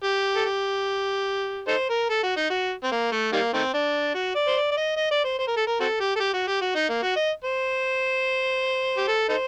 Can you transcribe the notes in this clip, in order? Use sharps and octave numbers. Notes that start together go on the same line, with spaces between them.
G4
A4
G4
D#4 A4 C5
A#4
A4
F#4
D#4
F#4
C4
A#3
A3
D#3 G3 A#3
D#3 A3 C4
D4
F#4
D5
C5
D5
D5
D#5
D#5
D5
C5
C5
A#4
A4
A#4
C4 F#4 A4
G4
A4
G4
F#4
G4
F#4
D#4
A#3
F#4
D#5
C5
G4
A4
D#4 A4 C5